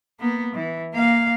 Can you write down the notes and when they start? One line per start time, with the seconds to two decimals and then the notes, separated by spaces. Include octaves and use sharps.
0.20 A#3 B3
0.55 E3
0.93 A#3 F5